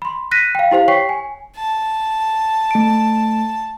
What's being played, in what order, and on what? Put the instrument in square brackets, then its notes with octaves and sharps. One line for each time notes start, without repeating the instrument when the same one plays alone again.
[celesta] B5 C6
F#6 A#6 B6 D#7
F5 G5
E4 G4 C5 F5
C#5 G5 C#6 B6 C7
G#5
[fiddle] A5
[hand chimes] A3 D7